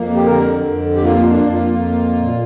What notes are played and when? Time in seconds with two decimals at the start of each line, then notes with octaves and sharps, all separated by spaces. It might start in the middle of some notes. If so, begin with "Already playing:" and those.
Already playing: F2 A#3
0.16 G4
0.26 D3 A#4
0.64 F2
0.96 G4
1.02 A#3 F4
1.28 D4
1.41 F2
1.53 F4
1.79 A#3
2.17 A#2